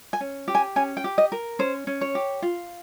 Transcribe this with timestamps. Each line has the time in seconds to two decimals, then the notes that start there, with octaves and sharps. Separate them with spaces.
0.13 G#5
0.21 C#4
0.48 G4
0.55 G#5
0.76 C#4 G#5
0.97 G5
1.04 G4
1.18 D#5
1.32 A#4
1.59 C#4 C5
1.87 C#4
2.01 C#5
2.15 G4
2.42 F4